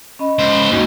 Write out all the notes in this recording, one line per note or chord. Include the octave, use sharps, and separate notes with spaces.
C#4 D#5 B5
C#2 C5
C#6
D#2 G#2 C#4 F#4 G#5